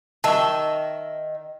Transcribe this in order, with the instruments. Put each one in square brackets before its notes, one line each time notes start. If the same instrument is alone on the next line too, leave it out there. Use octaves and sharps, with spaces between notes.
[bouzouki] D#3 E5 [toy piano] A5 C#6